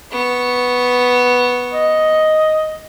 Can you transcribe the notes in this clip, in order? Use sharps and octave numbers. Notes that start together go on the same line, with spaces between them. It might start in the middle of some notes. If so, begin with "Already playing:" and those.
B3 C#6
D#5